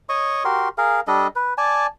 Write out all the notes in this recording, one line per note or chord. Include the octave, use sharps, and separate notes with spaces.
C#5 D#5 C#6 D#6
F#4 G4 A#4 C6
G#4 A#4 F5
G3 D4 A4 D#5
B4
D5 G#5 A5